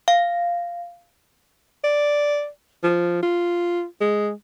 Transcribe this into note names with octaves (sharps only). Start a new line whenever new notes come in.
F5
D5
F3
F4
G#3